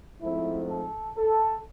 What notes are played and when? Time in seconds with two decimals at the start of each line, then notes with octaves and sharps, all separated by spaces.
0.21 G#2 F3 A3 C4 E4
0.68 A4
1.17 A4